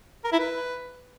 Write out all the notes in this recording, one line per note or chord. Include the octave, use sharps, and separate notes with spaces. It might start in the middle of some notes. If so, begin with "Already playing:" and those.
A#4
E4
B4